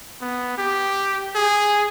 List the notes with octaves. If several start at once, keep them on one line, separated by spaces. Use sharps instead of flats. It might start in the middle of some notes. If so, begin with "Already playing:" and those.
B3
G4
G#4